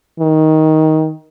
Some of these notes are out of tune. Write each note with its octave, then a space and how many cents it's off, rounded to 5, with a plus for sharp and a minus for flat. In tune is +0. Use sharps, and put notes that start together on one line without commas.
D#3 +15